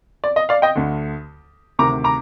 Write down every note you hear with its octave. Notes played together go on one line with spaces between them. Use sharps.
D5
D#5
D5 F5
D#5 G5
D2 D3
D2 C3 D#3 A#5 D6
A#5 D6